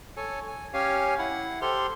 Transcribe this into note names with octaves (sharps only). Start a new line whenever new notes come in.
A4 C#5 G#5
G#5
C#4 G4 C#5 F5 G#5
E4 F#5
G4 A4 C5 C6 F6